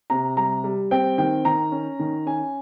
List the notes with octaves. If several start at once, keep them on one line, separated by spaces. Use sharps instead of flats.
C3 A#5
G3 A#5
G3
C4 G5
D#3 G5
D#3 A#5
C#4
D#3
C#4 G#5